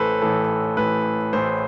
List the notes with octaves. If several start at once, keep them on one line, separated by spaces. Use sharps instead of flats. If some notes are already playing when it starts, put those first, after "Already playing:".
Already playing: A1 A2 E3 A4 B4 C5
A1 A2 E3 A4
A1 A2 E3 B4
A1 A2 E3 C5